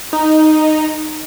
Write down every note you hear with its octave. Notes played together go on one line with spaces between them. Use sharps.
D#4